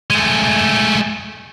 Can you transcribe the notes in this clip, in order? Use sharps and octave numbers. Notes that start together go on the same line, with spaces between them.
G#3 A3